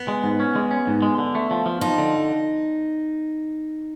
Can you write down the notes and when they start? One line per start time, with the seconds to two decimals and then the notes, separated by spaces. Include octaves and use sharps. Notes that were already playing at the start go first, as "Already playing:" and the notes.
Already playing: B3
0.08 G#3
0.24 G#2
0.40 C#4
0.56 G#3
0.71 C#4
0.87 G#2
1.02 G#3
1.18 D3
1.35 A3
1.51 F3
1.66 F3
1.81 F3 D#4
1.98 D3